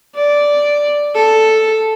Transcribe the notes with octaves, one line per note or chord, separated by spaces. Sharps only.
D5
A4